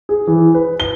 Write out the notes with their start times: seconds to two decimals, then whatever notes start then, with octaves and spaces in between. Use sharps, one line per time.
0.09 G#4
0.27 E3
0.55 B4
0.80 G7